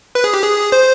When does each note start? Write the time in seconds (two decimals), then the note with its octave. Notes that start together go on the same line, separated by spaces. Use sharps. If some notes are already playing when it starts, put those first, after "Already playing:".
0.15 B4
0.24 G#4
0.34 G4
0.43 G#4
0.72 C5